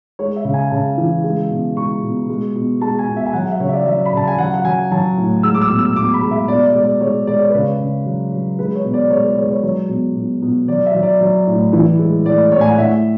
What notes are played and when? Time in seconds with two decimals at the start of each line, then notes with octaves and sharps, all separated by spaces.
0.19 G#3 C#5
0.36 E5
0.45 C#3
0.54 G#5
0.71 C#3 A5
0.98 E3
1.24 G#3
1.50 B2
1.76 G#3 C#6
2.03 B2
2.29 G#3
2.56 B2
2.81 G#3 A5
2.99 G#5
3.08 B2
3.16 E5
3.26 G#5
3.33 F#3 F#5
3.48 E5
3.60 C#3 C#5
3.68 E5
3.73 D5
3.86 F#3 E5
4.05 B5
4.13 C#3 A5
4.28 G#5
4.38 F#3 F#5
4.54 F#5
4.65 F#3 G#5
4.92 F#3 A5
5.18 A2
5.43 G#3 E6
5.55 D6
5.62 E6
5.70 B2
5.79 E6
5.96 B2 D6
6.14 B5
6.22 G#3
6.31 E5
6.48 B2 D5
6.66 D5
6.75 G#3
6.83 D5
7.01 G#3 C#5
7.27 G#3 D5
7.39 C#5
7.50 C#3 B4
7.61 C#5
7.79 C#3
8.06 F#3
8.32 F#3
8.59 G#3 B4
8.75 C#5
8.85 B2
8.94 D5
9.10 G#3 C#5
9.25 B4
9.37 G#3 C#5
9.50 C#5
9.63 F#3 C#5
9.89 B2
10.16 B2
10.42 B2
10.68 F#3 D5
10.86 E5
10.95 F#3
11.03 D5
11.21 F#3
11.47 A2
11.73 E3
11.99 G#3
12.25 A2 D5
12.52 A2 C#5
12.61 G#5
12.69 F#5
12.78 A2 E5